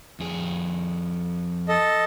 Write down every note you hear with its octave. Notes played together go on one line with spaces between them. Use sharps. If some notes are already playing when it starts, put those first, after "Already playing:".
F2 G#4
A4 D#5